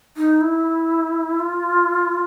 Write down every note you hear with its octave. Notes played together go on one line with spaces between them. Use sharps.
D#4
E4
F4